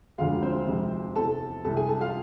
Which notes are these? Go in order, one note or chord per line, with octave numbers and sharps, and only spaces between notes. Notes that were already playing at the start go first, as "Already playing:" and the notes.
E1 D2 D3 F3 G#3 F4 F5
C4 C5
F1 F2 C3 G#3
E2 C3 E3 A4 A5
C2 C3 E3 A4 A5
G#4 G#5
A4 A5
F4 F5